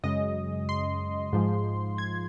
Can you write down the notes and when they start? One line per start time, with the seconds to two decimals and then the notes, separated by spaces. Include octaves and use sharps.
0.04 F#2 C#3 G#3 D#5
0.69 C6
1.33 G#2 F3 G#3
1.98 G#6